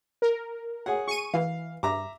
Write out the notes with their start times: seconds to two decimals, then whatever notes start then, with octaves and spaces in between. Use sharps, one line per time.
0.22 A#4
0.86 G#4 C#5 F#5
1.08 G#4 C#6 D#7
1.34 E3 F5
1.83 G2 E5 A#5 D6